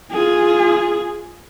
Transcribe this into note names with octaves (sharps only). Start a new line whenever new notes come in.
F4 G#4